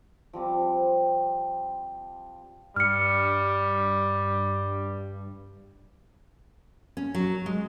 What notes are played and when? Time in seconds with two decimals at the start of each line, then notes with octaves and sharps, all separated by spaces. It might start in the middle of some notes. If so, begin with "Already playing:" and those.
0.33 F3 G3 C4 D6
2.76 G2 G3 F6 C#7
6.97 C#4
7.15 F#3
7.46 G#3